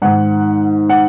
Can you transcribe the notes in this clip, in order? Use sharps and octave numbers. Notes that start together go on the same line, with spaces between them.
G#2 D#3 F#5
F#5